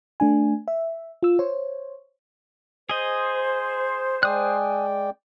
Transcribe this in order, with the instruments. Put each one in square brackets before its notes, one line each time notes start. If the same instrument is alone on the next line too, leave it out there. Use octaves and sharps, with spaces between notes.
[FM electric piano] A3 D4 G#5
E5
F4 E6
C5 C#5
[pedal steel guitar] G#4 D#5 [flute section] C5
[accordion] G#3 D5 G5 [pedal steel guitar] G#5 D#6 F#6